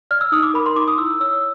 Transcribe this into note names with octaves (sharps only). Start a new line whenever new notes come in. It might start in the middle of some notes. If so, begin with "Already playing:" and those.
D5 F6
E6
D#4 D#6
D6
A#4 B5
C6
D#4 D6
D#6
E4 E6
C#5 E6